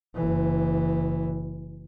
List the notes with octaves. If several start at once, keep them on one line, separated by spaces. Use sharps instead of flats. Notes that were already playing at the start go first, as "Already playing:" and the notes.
F#1 E3